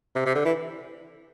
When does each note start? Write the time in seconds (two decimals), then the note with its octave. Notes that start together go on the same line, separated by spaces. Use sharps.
0.16 C3
0.26 C3
0.35 D3
0.45 E3